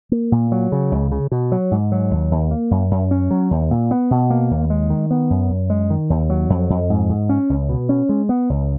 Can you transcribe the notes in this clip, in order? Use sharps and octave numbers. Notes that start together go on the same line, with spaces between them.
A#3
A#2
F#3
C#3
C#2
C#3
B2
F#3
G#2
F#3
D#2
D#2
A#3
F#2
F#2
C#4
F#3
D#2
A#2
B3
B2
A#3
D#2
G#3
D#3
B3
F#2
F#2
G#3
D#3
D#2
F#3
F2
F2
G#2
G#2
C#4
C#2
B2
C#4
G#3
B3
C#2